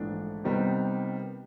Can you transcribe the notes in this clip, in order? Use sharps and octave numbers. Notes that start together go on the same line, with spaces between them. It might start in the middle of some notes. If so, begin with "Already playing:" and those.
Already playing: A#1 G#2 E3 A3 D4
C3 D#3 G3 B3